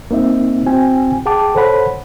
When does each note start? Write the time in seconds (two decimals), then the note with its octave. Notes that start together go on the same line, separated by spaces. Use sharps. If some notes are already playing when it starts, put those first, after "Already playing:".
0.11 A#3 C4 D#4 E5
0.66 C4 E4 F#4 G5 G#5
1.26 G#4 F#5 G5 A5 D6
1.55 A4 C5 C#5 F#5 B5